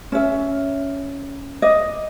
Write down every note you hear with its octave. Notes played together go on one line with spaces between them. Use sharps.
C#4 E5
D5 D#5